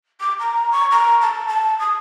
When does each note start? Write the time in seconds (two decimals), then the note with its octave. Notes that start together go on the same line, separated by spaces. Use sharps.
0.20 D6
0.39 A#5
0.72 C#6
0.91 A#5
1.21 A5
1.48 A5
1.80 D#6